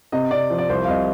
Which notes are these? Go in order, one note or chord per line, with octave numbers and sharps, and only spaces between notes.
C3 D#5
C3 D5
F3
D5
C2 C5
F5
C2 D#5